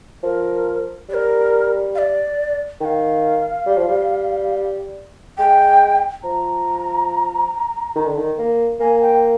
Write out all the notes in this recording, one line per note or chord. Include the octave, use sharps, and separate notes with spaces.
F3 A#4
G3 D5
A#4
F5
D5
D#3 F5 G5
G3
F3
G3
G#3 G5
F3 A#5
D#3
D3
D#3
A#3
A#3 G#5
G5